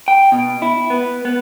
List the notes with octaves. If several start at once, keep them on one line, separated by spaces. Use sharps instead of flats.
G5
B2
E4
B3
B3